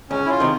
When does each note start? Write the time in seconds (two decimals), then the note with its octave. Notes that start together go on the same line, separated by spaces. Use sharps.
0.10 C#2 C#4
0.26 E4
0.30 F4
0.40 C3 D#3